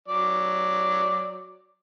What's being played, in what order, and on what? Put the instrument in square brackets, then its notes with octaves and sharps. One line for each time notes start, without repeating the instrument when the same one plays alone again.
[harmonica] F#3 D5